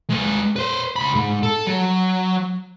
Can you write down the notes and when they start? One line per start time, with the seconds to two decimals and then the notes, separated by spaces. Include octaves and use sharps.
0.10 G#3 B4
0.56 B4 C5
0.96 C#2 B5
1.15 G#2
1.43 A4
1.67 F#3